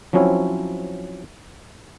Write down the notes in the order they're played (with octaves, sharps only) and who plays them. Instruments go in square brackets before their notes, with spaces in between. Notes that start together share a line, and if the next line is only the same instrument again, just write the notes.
[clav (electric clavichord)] F3 F#3 C4 C#4 E4